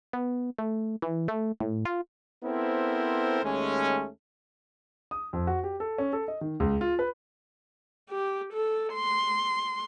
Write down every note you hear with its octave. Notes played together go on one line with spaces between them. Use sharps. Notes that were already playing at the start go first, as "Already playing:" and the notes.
B3
A3
E3
A3
A2
F4
B3 C4 E4 A4 A#4 C5
D#2 G#3 A3 C#4
D#6
F2
F#4
G4
A4
C#4
A4
D#5
D#3
C#2
F4
B4
G4
A4
C6